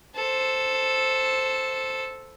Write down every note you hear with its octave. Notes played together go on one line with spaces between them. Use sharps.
A4 C5